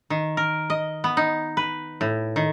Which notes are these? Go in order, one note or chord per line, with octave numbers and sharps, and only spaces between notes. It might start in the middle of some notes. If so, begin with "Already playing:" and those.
D#3
A#4
D#5
B3
D#4
B4
A2
D#3